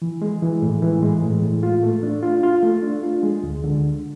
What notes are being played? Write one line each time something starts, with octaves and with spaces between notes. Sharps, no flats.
E3
G#3
E3
A2
E3
G#3
A2
A2
F4
A3
D4
F4
F4
A3
D4
F4
G#3
D2
D3